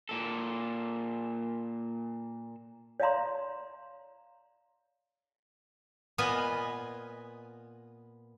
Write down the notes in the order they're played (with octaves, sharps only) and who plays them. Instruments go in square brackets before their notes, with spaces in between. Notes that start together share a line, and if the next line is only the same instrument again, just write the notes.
[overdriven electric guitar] A#2 A4
[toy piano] C#5 D5 E5 F5 A#5 C6
[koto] A#2 B3 F4 B4 D#5 G#5